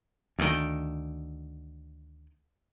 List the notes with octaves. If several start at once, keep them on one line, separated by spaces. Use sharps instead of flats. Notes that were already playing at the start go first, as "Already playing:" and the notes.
D2 D#3